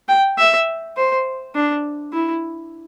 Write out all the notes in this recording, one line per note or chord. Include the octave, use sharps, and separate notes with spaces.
G5
E5
C5
D4
E4